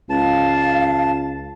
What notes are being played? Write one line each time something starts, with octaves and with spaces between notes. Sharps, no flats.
C#2 F5 A5